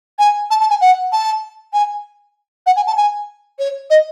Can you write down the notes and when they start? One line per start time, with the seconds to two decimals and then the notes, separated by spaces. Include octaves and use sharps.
0.19 G#5
0.51 A5
0.61 A5
0.70 G#5
0.81 F#5
1.12 A5
1.73 G#5
2.66 F#5
2.76 G#5
2.87 A5
2.97 G#5
3.59 C#5
3.90 D#5